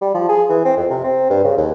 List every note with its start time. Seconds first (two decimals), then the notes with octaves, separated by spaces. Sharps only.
0.02 G3
0.14 F3
0.29 G#4
0.50 E3
0.65 C4
0.77 F2
0.91 C3
1.04 C4
1.30 G2
1.44 C#3
1.57 D#2